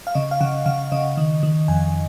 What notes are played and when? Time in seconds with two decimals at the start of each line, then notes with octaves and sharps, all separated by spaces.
0.07 F5
0.15 C#3 D#5
0.31 F5
0.41 C#3 F#5
0.66 C#3 F5
0.92 C#3 D#5
1.17 D#3
1.43 D#3
1.68 F2 G#5